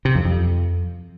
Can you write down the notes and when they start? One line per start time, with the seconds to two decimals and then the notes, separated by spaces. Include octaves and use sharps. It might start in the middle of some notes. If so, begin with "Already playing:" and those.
0.05 C3
0.15 F2
0.25 F2